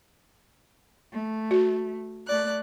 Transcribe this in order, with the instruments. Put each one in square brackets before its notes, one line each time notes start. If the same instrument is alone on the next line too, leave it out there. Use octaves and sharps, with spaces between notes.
[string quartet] A3
[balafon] F#4
[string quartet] A3 D5 F#6